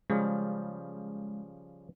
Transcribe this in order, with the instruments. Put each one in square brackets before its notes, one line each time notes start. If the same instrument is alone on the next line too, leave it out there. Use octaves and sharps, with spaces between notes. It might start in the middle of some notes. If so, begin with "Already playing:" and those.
[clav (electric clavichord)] C#3 F3 G3 [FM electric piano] G#3